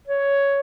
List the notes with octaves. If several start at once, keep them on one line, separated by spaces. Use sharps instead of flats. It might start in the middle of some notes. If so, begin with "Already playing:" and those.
C#5